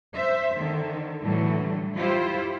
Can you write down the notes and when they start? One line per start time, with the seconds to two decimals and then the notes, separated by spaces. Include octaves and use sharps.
0.14 C5 E5
0.56 D3 D#3
1.22 A2 D3 E3 F#3 G3 A3
1.97 E4 F4 G4 C5